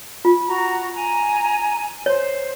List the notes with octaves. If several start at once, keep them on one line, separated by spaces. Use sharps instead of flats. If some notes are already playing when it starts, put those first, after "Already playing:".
F4
F#4 A#5
G#5 A#5
C5 C#5